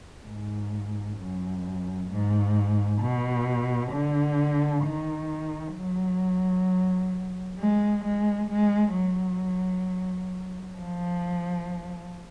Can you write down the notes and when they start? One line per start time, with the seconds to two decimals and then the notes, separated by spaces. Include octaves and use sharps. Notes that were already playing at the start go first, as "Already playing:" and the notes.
0.27 G#2
1.18 F#2
2.10 G#2
3.01 B2
3.92 D3
4.84 D#3
5.75 F#3
7.58 G#3
8.04 G#3
8.50 G#3
8.96 F#3
10.78 F3